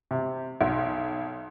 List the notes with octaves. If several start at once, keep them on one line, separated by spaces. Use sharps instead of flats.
C3
B1